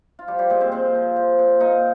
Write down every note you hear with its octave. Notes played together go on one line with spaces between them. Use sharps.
F4
F3 G3 G4
G3 G4
A#2 G#3 G#4
C4 C5
A#2 C4 C5
F3
F3
A#2
A#2 D#4 D#5